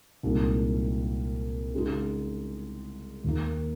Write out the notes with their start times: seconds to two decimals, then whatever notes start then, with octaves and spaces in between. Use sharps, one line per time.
0.23 C2 A#2 G#3 D#4
1.73 C#3 G#3 D#4 F#4
3.24 D#2 D#3 A#3